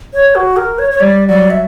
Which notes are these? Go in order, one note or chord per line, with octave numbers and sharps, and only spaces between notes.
C#5
F#4
A#4
C#5
C#5
G3 D5
F#3 D5
E5